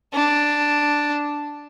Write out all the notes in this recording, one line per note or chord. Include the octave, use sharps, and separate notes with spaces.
D4